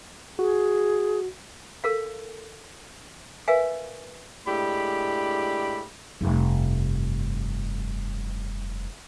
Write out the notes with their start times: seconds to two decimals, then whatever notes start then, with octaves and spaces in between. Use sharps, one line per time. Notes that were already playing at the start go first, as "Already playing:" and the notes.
0.39 F#4 G#4
1.84 A4 A#4 F5
3.48 A#4 B4 E5 F5 G#5
4.47 A2 G#3 D4 G4 B5
6.21 F1 G2